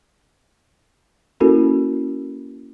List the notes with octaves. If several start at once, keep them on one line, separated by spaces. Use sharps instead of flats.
A#3 C#4 E4 F#4 A4 A#4